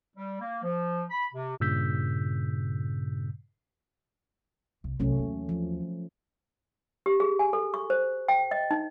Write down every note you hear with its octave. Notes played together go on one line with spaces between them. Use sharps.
G3
A#3
F3
B5
C3
G2 A#2 C#3 E6 G6 B6
C2
C2 C3 F#3 A3 C#4
D#2 E3
F3
G4
G#4
G#5
A4
C#6
C5
G5
D#5
D#4